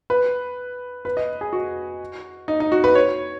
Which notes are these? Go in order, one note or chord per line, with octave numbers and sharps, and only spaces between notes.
B4
B4
D#5
G#4
F#4
D#4
D#4
F#4
B4
C#5